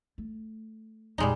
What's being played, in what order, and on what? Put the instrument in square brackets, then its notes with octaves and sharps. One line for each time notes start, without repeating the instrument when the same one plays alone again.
[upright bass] A3
[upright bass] F2 A#2 [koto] G3 G#3 D#4